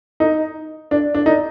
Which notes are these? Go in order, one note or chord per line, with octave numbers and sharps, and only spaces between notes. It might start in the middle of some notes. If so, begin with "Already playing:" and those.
D#4
D4
D4
D#4